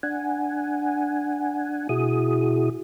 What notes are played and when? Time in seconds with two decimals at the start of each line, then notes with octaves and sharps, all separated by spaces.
0.03 D4 F#5 G#5
1.89 B2 E4 F#4 G#4 D#6